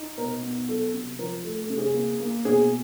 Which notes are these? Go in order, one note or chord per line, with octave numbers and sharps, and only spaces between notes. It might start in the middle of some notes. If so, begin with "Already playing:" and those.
Already playing: D#4
B2 A#4
B3
F#3 A4
C3
F3 A#4
A3 A4
A4
C3
G#4
A#3
A#3
B2 G#4